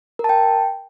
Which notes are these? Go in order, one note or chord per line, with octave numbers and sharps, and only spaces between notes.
A#4
A5
G5